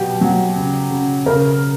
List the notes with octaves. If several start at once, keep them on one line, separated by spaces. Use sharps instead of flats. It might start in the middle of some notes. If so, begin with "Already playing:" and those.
Already playing: B2 F#3 G4
F#3
C#3
C#3
C#3 A#4